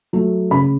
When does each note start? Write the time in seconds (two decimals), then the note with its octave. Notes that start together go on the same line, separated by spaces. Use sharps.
0.13 F#3 A3
0.51 C#3 B5